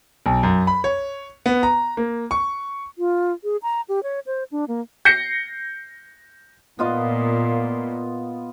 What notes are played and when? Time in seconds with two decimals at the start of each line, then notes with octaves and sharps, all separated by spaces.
0.26 B1
0.43 F#2
0.67 B5
0.84 C#5
1.46 B3
1.63 A#5
1.97 A#3
2.31 C#6
2.98 F4
3.44 G#4
3.63 A#5
3.89 G4
4.03 C#5
4.26 C5
4.52 D4
4.68 A#3
5.05 G6 A#6 C7 C#7
6.79 A#2 B3 F4 D#5